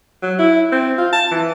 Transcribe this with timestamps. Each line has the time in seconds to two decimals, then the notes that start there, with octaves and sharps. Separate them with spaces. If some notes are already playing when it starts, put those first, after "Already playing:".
0.22 F#3
0.39 E4
0.72 C4
0.98 F4
1.13 A5
1.31 E3